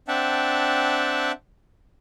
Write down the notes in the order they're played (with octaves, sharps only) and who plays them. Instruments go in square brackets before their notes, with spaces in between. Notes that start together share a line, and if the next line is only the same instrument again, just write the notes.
[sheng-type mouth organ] C4 D4 E5 F#5 G5 A5